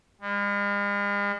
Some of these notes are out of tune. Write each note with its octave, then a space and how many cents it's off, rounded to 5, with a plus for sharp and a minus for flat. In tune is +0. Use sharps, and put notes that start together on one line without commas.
G#3 -45